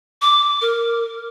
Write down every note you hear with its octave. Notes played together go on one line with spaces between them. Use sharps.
D6
A#4